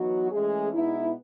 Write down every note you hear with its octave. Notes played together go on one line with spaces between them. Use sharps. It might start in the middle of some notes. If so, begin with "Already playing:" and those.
Already playing: E3 F#3 B3 D#4 F#4
E3 G#3 A3 C#4 G#4
B2 G#3 B3 D#4 E4